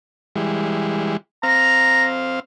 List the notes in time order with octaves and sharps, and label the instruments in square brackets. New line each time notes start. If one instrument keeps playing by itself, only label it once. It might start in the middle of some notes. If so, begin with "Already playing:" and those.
[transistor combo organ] E3 G3 G#3
[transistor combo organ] C4 F5 [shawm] A#5